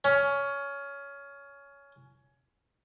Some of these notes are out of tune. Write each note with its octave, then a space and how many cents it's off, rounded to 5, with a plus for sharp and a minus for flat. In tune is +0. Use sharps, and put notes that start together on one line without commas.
C#4 +15